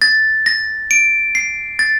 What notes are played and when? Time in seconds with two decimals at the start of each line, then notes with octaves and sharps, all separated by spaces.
0.02 A6
0.46 A#6
0.91 D7
1.35 C7
1.79 A6